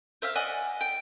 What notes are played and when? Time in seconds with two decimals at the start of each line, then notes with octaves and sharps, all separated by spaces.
0.22 C5 E5 F5 F6
0.35 D5 D#5 F#5 G#5
0.81 G5